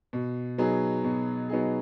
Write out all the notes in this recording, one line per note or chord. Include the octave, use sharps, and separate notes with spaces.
B2
F#3 B3 D#4 G#4
B2
F#3 B3 D#4 G#4